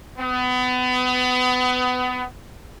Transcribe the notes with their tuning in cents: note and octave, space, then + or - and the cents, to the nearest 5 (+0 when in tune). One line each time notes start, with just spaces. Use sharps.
B3 +30